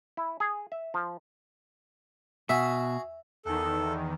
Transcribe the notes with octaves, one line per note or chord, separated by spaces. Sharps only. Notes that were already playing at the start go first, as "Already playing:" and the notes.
E4
G#4
E5
F3
B2 F#4 G#4 E5
E2 D#3 A4